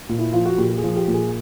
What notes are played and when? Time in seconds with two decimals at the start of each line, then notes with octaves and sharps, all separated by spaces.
0.09 A#2
0.19 E4
0.33 F3 F4
0.45 F#4
0.58 A#2 G4
0.70 G4
0.78 G#4
0.84 F3
0.96 G4
1.08 A#2
1.14 G#4